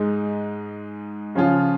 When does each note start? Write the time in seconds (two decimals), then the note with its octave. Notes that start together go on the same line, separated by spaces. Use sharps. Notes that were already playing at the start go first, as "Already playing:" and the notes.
Already playing: G#2 G#3 D#4
1.35 C#3 F3 C#4 F4